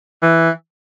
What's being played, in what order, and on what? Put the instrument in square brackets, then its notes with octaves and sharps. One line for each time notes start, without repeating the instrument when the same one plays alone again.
[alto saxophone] E3